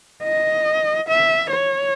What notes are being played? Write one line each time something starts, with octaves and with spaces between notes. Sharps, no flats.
D#5
E5
C#5